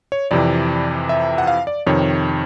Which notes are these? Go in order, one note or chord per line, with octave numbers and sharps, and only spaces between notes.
C#5
F2 C3 E3 D5
E5
F#5
F5
D5
F2 C3 D#3 C#5